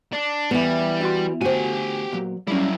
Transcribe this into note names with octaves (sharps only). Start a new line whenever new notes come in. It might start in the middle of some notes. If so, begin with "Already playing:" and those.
D4
E3 G3 B3
E4 F#4 C6
D2 F#4 G4 C5 G#5
A#2 F#3
F#3 G3 C#4 E4